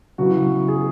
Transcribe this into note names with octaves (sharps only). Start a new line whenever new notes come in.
C#3 F#3 B3 E4 F#4
G#4